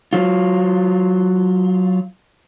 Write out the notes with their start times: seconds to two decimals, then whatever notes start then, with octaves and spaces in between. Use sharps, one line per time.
0.13 F#3 F4